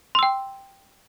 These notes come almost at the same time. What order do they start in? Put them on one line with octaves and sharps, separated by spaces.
C6 E6 G5